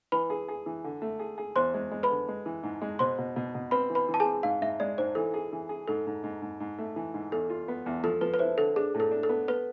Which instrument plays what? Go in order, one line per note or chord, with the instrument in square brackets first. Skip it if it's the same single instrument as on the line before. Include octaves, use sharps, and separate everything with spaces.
[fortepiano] E3 [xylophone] B4 B5
[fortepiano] G#4
G#4
E3
D3
A3
G#4
G#4
[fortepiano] E2 [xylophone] C5 C6
[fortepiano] G#3
G#3
[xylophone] B4 B5
[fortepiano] D3
G#3
E3
G#2
G#3
[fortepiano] B2 [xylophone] C5 C6
[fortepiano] B2
B2
B2
[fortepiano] C4 [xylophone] B4 B5
[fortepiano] E3
[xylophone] B4 B5
[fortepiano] E3
[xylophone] A5
G#4 G#5
[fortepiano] C4
[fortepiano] G#2 [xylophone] F5
[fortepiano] G#2 [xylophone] E5
[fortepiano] G#3 [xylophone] D5
[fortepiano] G#2 [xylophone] C5
[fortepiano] E3 [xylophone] A4
[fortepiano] G#4
E3
G#4
[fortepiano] G#2 [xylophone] A4
[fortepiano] G#2
G#2
G#2
G#2
A3
E3
G#2
[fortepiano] E2 [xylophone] A4
[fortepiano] F4
B3
E2
[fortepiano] F3 [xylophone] A4
[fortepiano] F3 [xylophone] B4
[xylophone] B4
[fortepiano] E4 [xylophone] C5
[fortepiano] D3 [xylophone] A4
[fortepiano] D4 [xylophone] G#4
[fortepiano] A2
[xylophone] A4
[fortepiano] D4
[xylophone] A4
[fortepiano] B3
[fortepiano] B3 [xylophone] B4